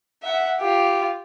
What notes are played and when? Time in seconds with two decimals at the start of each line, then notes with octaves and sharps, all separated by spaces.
0.23 E5 F#5
0.60 F4 G4